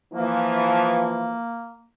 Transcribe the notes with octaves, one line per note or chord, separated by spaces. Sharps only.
E3 F3 A#3